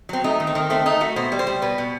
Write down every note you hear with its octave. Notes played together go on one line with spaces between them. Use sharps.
F#3 C4
A3 D#4
D#3
C4
D#3
A3 C4
A3 D#4
A3 F#4
B2 C5
G3
C5
G3
B2 B4
B2